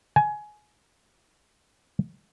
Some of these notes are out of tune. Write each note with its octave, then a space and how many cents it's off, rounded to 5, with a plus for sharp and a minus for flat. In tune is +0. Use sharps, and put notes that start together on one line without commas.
G#5 +20